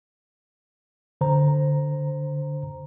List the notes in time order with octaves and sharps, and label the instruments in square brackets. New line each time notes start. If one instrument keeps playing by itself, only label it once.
[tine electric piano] D3 C5 A#5